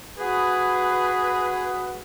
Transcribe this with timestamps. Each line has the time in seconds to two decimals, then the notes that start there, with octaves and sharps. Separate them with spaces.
0.18 F#4 G#4 B4